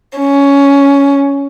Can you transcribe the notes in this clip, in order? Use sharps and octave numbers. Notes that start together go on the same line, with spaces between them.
C#4